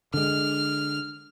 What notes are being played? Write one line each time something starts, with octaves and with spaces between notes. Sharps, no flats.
D3 G#3 F6